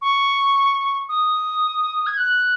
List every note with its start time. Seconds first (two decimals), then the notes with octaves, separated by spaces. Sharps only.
0.02 C#6
1.09 D#6
2.06 G#6
2.17 F#6